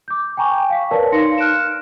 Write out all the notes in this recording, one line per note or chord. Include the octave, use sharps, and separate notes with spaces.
D6 G6
G5 G#5 A#5 C#6
F5 B6
A#4 B4 C#5 D5 F5 A5
D#4 F5 C6 A#6 C#7
F6 F#6 D7 E7